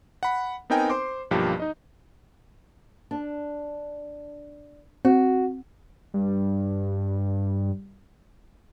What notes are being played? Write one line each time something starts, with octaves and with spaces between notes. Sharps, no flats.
F#5 B5
B3 C4 D#4 A#4 G5 G#5
C5 C6 D6
B1 G2 F3 A#3 G4
D#4 D#5
D4
C4 F#4
G2 G3